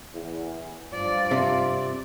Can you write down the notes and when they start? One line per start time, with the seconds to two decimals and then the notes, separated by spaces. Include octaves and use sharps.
0.15 E2
0.93 G2 F3 F4 D5
1.31 C3